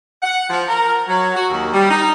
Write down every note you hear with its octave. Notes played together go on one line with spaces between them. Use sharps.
F#5
F3
A#4
F#3
F#4
D#2
G3
D#4